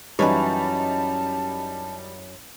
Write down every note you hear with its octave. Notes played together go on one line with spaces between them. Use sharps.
F#2 E3 G3 C#4 D#4 B4 C#5 A5